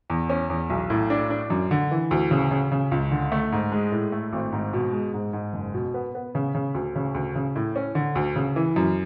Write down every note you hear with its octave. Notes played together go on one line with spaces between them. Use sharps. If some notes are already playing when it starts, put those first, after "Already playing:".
E2
C#4
E2
B1
A2
D4
D4
F#2
D3
E3
D2
C#3
C#3
C#3
C#2
D3
A3
G#2
G#3
A2
A3
G#1
G#2
B2
G#3
G#2
G#2
F#1
B2
B3
B3
C#3
C#3
D2
C#3
D2
C#3
A2
C#4
D3
D2
C#3
E3
F#2